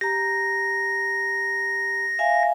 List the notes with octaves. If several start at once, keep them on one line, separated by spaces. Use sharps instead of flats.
G4 A#5 A#6
E5 F5 G#5